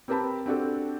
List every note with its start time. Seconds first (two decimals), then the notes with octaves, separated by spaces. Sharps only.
0.08 C4 G4 A#4 B4 A5 B5
0.46 C4 D4 F#4 G4 A4